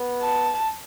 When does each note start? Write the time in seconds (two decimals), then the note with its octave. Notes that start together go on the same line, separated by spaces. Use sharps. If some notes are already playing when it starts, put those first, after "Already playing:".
Already playing: B3
0.22 A5